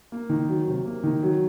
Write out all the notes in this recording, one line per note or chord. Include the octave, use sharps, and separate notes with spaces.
A#3
D#3
F#3
C3
A#3
D#3
F#3